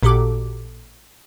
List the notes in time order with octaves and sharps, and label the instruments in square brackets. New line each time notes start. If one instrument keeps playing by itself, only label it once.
[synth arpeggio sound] A1 A#2 F#4 G4 A4 D6